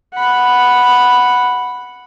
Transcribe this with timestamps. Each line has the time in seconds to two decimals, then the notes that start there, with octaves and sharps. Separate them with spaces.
0.14 F#5 B5